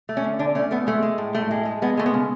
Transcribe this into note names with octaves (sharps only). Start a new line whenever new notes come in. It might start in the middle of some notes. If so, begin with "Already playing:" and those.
A3
C#4
D3
D3 D4
A3 C#4
A3 B3
G#3 A3
G#3
A2
A2 A3
G#3
G#3
G#3 B3
G#3 A3
B3
C#3